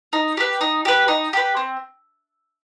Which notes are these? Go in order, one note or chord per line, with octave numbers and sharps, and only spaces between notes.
D#4
G4 B4
D#4
G4 B4
D#4
G4 B4
C4